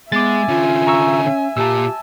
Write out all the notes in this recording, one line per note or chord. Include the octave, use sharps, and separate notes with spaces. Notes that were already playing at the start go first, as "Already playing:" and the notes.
G#3 B3 E5 G#5 D6 A6
D3 C#4 F4
A#5 C#6 E6
C#4
A#2 F4 G4 A5 E6